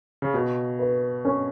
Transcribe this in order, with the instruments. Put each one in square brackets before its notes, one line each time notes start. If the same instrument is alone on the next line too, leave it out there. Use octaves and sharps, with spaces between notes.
[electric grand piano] C#3
[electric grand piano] B2 [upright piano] F#4
[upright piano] B4
C#4